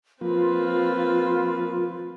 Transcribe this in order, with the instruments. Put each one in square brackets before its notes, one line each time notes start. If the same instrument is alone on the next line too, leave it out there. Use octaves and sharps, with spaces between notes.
[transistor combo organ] F3 A#3 [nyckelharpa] C4 B4 [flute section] F4